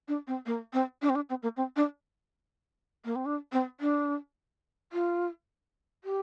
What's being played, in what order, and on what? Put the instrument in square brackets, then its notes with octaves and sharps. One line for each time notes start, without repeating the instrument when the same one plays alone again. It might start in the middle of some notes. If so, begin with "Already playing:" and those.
[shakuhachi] D4
C4
A#3
C4
D4
C4
D4
C4
A#3
C4
D4
A#3
C4
D4
C4
D4
F4
G4